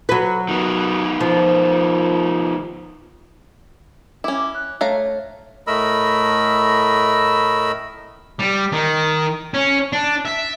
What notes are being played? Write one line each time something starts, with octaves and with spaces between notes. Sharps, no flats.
F#3 B4
D#3 B3
F3
C#4 E4 D6
F#6
A3 C#5 F5 A#5
A2 A3 A#4 D#5 B5 E6
G3
D#3
C#4
D4
E5